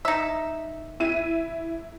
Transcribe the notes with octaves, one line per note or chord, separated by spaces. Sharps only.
D#4 E5
E4 D#7